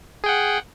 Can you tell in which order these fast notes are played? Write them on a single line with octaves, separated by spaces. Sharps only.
G#4 G5 F#5